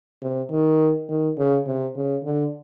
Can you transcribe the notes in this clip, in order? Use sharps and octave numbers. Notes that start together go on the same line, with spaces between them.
C3
D#3
D#3
C#3
C3
C#3
D3